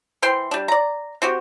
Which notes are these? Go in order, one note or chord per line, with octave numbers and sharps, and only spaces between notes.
E3 C5 G5 C6
G3 D4
D5 A#5
C4 F#4 G4